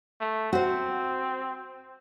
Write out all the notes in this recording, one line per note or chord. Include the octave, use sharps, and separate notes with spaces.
A3
C4 F#4 C5